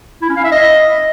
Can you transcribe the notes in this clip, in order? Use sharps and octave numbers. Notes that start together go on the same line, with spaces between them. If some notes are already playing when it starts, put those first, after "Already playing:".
E4
C#4
F5
E5
D#5